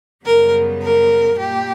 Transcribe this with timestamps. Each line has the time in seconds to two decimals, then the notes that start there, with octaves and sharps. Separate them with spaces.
0.25 F#2 C#3 G3 B3 A#4
0.82 A#4
1.38 A#2 A#3 G4